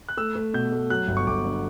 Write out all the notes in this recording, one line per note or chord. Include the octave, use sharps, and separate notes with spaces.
F#6
A3 E6
A3
B2 G6
A3
F#3 F#6
G1
C#6
G1 D6
D3